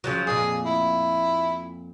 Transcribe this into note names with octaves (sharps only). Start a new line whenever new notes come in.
C#3 F3 F#3
F2 A#2 G#4
E4